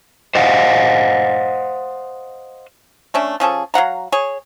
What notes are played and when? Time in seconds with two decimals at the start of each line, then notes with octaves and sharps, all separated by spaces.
0.35 C5 D#5 F5 F#5
3.14 A3 C#4 D4
3.40 F3 C#4 G#4 A4
3.74 F#3 F5 F#5 A#5
4.12 G#4 C#5